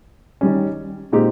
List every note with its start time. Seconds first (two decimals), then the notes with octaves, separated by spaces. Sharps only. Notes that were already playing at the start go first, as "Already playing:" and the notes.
0.41 D#3 G3 C#4
1.12 A#2 G#3 C4 D#4 G4